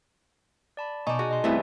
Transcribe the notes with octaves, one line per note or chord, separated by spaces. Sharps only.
D5 A5 B5
B2 D#4 D5 G#5 A5 C#6
F#4 G#4
D#5 C6
G2 E3 A3 B3 C4 E4 D5 G#5